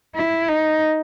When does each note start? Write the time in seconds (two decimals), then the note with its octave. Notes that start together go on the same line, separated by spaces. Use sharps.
0.16 E4
0.48 D#4